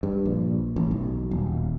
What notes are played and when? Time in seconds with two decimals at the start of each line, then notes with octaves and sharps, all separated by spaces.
0.03 G2
0.26 A#1
0.76 A1
0.91 B1
1.31 D#1